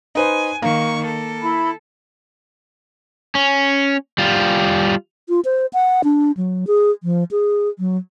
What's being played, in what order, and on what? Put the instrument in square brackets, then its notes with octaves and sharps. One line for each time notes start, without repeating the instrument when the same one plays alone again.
[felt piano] D#4 B4 C5 [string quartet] G#5
[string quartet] D#3 C#6 [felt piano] A#3
[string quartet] A4
[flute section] E4 B5
[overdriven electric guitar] C#4
G3 F4
[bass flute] F4
C5
F#5
D4
F#3
G#4
F3
G#4
F#3